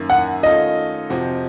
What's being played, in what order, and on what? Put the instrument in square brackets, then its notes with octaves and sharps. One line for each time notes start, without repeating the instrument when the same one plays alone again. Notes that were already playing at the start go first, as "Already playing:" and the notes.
Already playing: [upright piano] F#2 D#3 A#3 C#4
[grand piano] F#5
[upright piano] D#3 A3 C#4 F4 A4 [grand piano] D#5
[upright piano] F2 C3 F3 C4 F#4